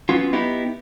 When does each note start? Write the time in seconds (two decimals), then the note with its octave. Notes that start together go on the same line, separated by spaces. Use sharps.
0.09 F#3 B3 C#4 F4
0.33 B3 D#4 E4 G4